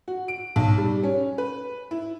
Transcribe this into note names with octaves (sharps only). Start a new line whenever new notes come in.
F#4
D7
B1
G3
C#4
B4
E4